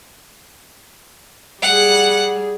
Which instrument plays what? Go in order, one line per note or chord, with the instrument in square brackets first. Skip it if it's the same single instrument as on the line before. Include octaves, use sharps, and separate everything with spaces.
[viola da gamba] G3 G#4 [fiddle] F#5